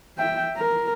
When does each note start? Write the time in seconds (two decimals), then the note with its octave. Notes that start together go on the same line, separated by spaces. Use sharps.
0.17 E5 G5
0.57 A#4